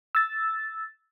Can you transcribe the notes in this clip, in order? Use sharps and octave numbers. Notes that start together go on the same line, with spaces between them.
E6 A6